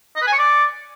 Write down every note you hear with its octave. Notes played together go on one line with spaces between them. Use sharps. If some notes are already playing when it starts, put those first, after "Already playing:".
D#5
B4
G#5
C#5
D5